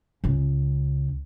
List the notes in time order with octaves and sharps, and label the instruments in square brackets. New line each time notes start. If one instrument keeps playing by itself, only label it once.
[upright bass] C#2 C#3